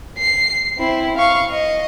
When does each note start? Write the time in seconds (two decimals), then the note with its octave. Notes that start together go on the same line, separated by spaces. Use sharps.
0.18 C7
0.77 C4 E4
1.16 F5 C#6
1.51 D#5